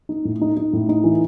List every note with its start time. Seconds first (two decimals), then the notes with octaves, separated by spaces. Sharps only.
0.09 D#4
0.25 A2
0.41 D#4
0.57 D#4
0.73 A2
0.89 D#4
1.04 E3